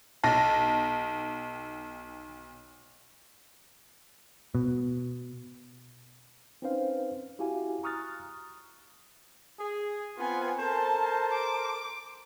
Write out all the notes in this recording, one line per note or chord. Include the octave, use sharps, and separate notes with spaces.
B1 A5 A#6
B2
C4 C#4 D#4 B4 C5 F5
E4 F#4 G4 F5 G#5
A#5 C#6 D#6 F6 F#6 A6
G#4
B3 C4 F4 G#5
A4 A#4 C5 A5
D6